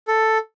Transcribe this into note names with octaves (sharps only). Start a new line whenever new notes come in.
A4